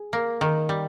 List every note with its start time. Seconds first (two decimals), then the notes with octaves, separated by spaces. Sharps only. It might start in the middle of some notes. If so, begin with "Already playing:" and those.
Already playing: G#4
0.13 A#3
0.41 D#3
0.69 G3